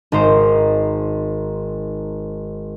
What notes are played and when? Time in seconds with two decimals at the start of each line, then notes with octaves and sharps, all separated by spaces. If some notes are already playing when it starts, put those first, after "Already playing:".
0.12 G#1 D#4 C5